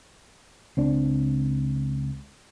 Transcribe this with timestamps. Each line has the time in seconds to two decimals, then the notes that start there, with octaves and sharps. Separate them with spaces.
0.77 C#2 C4 D4